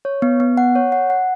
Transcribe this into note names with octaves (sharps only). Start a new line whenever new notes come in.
C#5
B3
B3
F#5
C#5
F#5
F#5